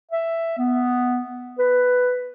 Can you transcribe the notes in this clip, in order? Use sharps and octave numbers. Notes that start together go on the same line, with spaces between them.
E5
B3
B4